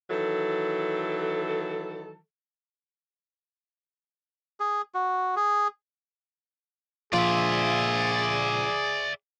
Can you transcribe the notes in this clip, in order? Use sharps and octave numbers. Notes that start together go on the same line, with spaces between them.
D#3 E3 F#3 A4
G#4
F#4
G#4
A#2 F3 F4 G#4 D5 E5